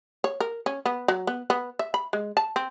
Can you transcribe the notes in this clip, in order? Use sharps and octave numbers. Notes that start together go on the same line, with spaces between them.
C#5
A#4
C#4
B3
F#3
B3
B3
E5
B5
G#3
A5
C4